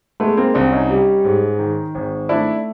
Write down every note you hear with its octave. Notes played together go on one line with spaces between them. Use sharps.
G#3 A3 B3
A#3 C4
C2 C4 D4
C#4 D#4
G3
G#2
D#3
G#1
A3 D4 E4